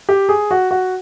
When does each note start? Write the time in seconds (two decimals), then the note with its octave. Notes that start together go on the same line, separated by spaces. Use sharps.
0.09 G4
0.29 G#4
0.51 F#4
0.71 F#4